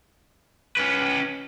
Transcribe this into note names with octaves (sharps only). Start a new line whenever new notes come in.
C#4 B4